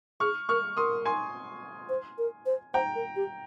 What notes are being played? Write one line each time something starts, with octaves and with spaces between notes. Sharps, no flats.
G#4 C#6 F6
A#4 C#6 F6
A#4 C6 D#6
G#5 C6
C5
A#4
C5
C5 G5 A#5
A#4
G4